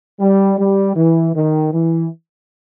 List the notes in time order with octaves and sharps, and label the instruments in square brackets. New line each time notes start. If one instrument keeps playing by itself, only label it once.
[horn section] G3
G3
E3
D#3
E3